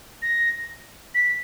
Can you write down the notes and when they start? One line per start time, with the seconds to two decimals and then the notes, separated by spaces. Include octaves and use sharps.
0.22 A#6
1.15 B6